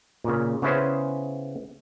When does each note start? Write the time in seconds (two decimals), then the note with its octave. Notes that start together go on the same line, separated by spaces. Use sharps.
0.24 A#2 C#3
0.62 C#3 B3 C#4 E4 G#4 C5